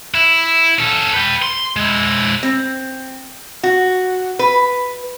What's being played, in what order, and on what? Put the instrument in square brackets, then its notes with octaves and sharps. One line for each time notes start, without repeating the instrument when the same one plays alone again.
[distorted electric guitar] E4
C#4 A4
B4 G5
C6
G#3 E4
[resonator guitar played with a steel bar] C4
F#4
B4